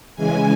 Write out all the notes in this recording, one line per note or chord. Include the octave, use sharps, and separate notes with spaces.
C#3 E3 G#3 G#5